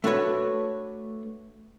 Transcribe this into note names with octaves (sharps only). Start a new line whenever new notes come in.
A3 D4 F#4 B4 C#5